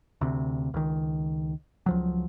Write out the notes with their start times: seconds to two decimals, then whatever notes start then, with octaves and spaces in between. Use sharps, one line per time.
0.21 D2 C3
0.74 C#2 D#3
1.86 C#2 F3 F#3